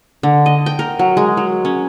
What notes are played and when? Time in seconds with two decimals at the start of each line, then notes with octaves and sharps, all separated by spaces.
0.23 D3
0.46 D#5
0.66 G5
0.79 A#4
0.99 F#3
1.17 G#3
1.37 F#3
1.65 C#4